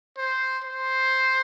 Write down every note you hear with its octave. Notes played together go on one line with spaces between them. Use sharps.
C5
C5